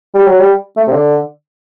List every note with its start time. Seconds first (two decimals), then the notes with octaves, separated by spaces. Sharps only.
0.14 G3
0.26 F#3
0.39 G3
0.77 A3
0.87 C3
0.92 D3